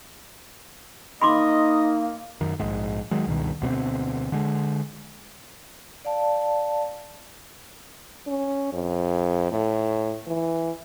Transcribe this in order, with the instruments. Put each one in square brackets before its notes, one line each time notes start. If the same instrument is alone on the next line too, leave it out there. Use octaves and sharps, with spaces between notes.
[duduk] A#3 [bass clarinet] D#4 [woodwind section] D#5 [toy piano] B5 C6 D6
[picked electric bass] F#2 D#3
A#1 G#2
D#3 F#3 G#3
C#2 G2 B2 D#3
D2 B2 A#3 C4
D3 G#3
[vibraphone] D5 F5 A5
[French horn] C#4
F2
A2
E3